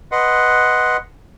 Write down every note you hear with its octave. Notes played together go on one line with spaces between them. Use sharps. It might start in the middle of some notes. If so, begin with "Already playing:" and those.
B4 D#5 F#5 C6